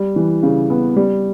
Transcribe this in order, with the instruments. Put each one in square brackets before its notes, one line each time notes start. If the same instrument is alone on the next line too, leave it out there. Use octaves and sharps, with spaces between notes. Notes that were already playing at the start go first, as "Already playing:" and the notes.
Already playing: [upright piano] G3
E3
C#3
B3
G3